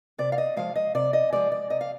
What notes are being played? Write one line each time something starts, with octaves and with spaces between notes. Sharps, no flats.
C3 D5
F5
D#5
F3 G#3 F5
D#5
C3 D5
D#5
F3 G#3 D5
D5
C3 D#5
F5